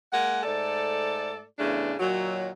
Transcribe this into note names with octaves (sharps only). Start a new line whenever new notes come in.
G#3 A#3 F#5
G#2 A3 A4 D5
E2 G2 C#3 A3 D4
A#2 D#3 F#3